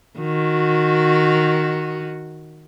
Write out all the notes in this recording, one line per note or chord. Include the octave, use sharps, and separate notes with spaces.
D#3 F#4